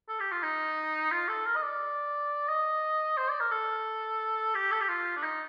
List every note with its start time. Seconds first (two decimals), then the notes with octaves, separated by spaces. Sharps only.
0.09 A4
0.20 G4
0.32 F4
0.43 D#4
1.12 F4
1.28 A4
1.46 A#4
1.56 D#5
1.63 D5
2.49 D#5
3.17 C5
3.29 D5
3.40 A#4
3.51 A4
4.55 G4
4.72 A4
4.81 G4
4.89 F4
5.17 D4
5.23 D#4